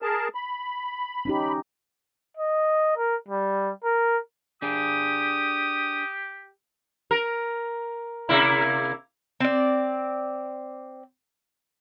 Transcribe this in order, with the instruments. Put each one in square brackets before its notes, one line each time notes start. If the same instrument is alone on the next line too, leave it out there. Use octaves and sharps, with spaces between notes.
[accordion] G#4 A#4 A5
B5
[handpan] C#4 D#4 G4
[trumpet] D#5
A#4
G3
A#4
[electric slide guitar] D4 G#4 [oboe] G4 [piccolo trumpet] D#6
[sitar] A#4
C3 A#3 E4
[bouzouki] C4 D5